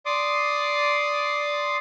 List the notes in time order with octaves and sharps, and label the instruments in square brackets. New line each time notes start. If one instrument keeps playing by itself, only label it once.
[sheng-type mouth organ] D5 C6 D6 D#6